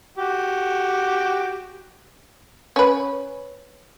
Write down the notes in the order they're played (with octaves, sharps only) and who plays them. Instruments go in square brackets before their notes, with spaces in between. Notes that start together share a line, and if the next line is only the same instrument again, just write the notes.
[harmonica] F#4 G4
[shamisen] C#4 B4